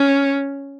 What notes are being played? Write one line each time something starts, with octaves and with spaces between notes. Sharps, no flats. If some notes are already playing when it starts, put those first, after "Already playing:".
Already playing: C#4